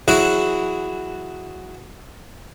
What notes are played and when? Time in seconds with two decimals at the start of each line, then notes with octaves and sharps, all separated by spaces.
0.08 E3 F#3 E4 F#4 G#4